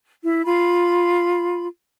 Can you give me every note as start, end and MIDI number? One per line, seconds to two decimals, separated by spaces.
0.23 0.40 64
0.44 1.67 65
0.44 1.67 83